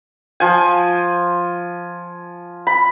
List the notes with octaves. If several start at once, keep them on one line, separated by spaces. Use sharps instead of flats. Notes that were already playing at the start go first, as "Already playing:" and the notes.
F3 G#5
B5